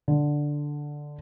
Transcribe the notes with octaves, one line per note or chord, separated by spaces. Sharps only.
D3